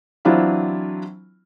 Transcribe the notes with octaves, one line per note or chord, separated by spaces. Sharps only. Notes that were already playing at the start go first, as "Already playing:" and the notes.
E3 F#3 C4 D4 E4 F4